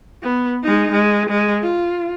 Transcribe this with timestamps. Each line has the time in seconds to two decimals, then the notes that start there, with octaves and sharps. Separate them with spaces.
0.23 B3
0.64 G#3 D#4
0.92 G#3
1.29 G#3
1.63 F4